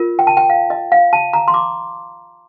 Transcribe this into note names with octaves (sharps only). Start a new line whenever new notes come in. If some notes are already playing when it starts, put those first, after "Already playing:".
Already playing: F4 A#4
G5
A5
G5
F5
D#5
F5
A5
A#5
C6
D6